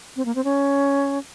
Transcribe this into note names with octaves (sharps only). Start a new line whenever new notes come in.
C4
A#3
C4
C#4